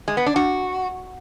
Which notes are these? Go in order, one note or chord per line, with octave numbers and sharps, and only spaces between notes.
G#3
B3
D4
F#4